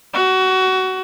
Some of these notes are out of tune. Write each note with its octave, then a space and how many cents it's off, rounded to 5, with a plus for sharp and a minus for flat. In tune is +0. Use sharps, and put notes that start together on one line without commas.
F#4 +20